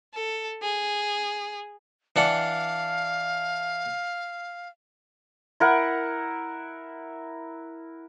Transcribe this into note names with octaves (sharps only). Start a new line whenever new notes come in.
A4
G#4
E3 D4 F5 F#5
E4 A#4 F#5